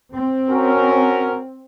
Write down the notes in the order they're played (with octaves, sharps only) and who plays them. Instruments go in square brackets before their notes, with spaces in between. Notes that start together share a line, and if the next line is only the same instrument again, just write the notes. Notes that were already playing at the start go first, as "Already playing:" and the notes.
[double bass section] C4
[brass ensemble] C#4 F#4 A#4